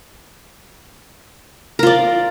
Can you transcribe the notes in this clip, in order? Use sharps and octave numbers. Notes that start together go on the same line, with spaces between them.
F4 A#4 D5